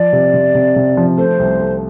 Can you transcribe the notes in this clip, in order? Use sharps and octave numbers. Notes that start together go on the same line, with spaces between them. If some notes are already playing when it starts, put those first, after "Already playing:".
Already playing: F3 D5
C3
C3
C3
C3
F3
A3 C5
C2
A3